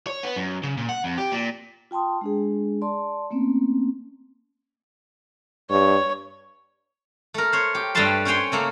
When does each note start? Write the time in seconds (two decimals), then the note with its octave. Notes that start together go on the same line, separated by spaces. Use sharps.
0.07 C#5
0.23 B3
0.36 F#2
0.63 C#3
0.77 A#2
0.89 F#5
1.04 F2
1.18 G4
1.32 A#2
1.91 F4 G5 A5 C6 D#6
2.21 G#3 D4 G#4
2.82 D5 A5 C6
3.31 A3 A#3 C4 C#4
5.70 G2 C#5
7.34 A3 A#4
7.53 C5 C#5
7.75 G4
7.95 G2 G3 A3 B4 A5 C6
8.25 C#4 C5 C#5 G5 G#5 C6
8.52 C#3 A3 A#3